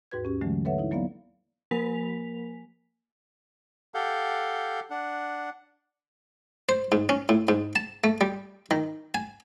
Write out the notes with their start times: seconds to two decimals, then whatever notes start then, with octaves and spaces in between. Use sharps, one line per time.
0.11 D#2 G#2 F#4 B4 G#6
0.25 C#4 G4
0.41 D3 E3 F#3 G#3 A3
0.65 A4 B4 C#5 E5 F#5
0.78 D#4 E4
0.91 F#3 A#3 B3 D5 F5
1.71 F3 A#3 A#4 G#5 B6 F7
3.94 G4 A4 F5 F#5 G6
4.90 D4 F#5
6.69 C5
6.92 G#2
7.09 C#4
7.29 A2
7.49 G#2
7.76 A5
8.04 A3
8.21 G3
8.71 D#3
9.15 G#5